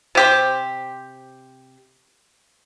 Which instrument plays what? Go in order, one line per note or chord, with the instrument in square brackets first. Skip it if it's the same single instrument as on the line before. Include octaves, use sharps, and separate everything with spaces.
[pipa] C3 G4 C5